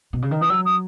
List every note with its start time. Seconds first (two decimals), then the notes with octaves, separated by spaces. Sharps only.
0.13 B2
0.22 C#3
0.31 D#3
0.41 E3 D#6
0.49 F#3 E6
0.65 D#6